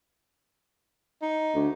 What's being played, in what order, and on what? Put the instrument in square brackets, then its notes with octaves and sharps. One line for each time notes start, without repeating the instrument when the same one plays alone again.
[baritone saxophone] D#4
[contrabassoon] D2